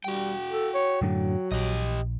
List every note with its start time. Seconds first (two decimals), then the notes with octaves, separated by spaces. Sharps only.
0.04 G3 F#4 G5
0.49 A4
0.74 C#5
1.02 F#2 A2 D3 F#3
1.52 A#1 G4 D#5